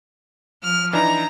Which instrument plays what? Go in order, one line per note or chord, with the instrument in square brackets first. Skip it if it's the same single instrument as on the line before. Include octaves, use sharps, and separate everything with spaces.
[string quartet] F3 F6
[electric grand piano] E3 D4 D#4 [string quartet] A#5